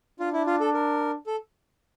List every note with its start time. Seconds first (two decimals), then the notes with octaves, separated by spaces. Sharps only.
0.20 D4 F4
0.33 E4
0.46 F4
0.60 A4
0.74 A#4
1.27 A4